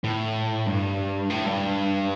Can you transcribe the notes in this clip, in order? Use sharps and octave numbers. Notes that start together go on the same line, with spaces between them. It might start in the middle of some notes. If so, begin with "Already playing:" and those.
A2
G2
A2
G2